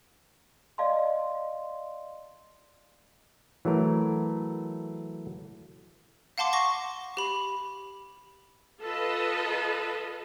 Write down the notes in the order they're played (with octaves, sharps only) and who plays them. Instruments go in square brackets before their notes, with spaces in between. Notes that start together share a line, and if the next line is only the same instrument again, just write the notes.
[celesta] D5 D#5 F5 A5 C6
[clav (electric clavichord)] E3 F#3 A3 A#4
[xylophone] F5 F#5 A5 C6 D6
C#6 D6 A#6
G4 B5
[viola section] F4 A4 B4 D#5 A5